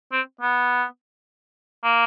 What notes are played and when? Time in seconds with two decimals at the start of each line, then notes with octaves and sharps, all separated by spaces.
0.12 C4
0.41 B3
1.84 A#3